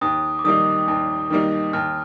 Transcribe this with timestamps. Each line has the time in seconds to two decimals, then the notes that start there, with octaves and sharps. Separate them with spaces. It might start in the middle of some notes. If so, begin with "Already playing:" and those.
0.01 D#2 D#6
0.39 D6
0.44 D#3 G3 A#3 D#4 D#6
0.88 D#2
1.30 D#3 G3 A#3 D#4
1.73 D#2 F6